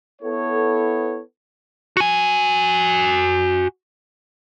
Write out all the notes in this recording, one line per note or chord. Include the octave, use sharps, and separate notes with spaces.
B3 E4 A4 C#5
F#4 G#5